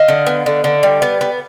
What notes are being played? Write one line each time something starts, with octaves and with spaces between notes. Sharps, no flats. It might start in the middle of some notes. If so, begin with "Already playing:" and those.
Already playing: D#5 F5
D3
B3
D3
D3
G3
B3
B3